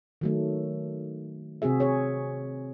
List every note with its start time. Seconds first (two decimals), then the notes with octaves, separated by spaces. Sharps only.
0.21 D#3 F#3 A3
1.62 C3 C4 F#4 G#4 E5
1.80 G#4 C#5